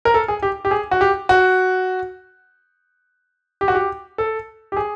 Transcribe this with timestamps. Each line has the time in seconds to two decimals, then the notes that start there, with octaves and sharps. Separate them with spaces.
0.05 A#4
0.14 A4
0.28 G#4
0.42 G4
0.65 G4
0.71 G#4
0.91 F#4
1.01 G4
1.29 F#4
3.61 G4
3.68 F#4
3.74 G4
4.18 A4
4.72 G4
4.77 G#4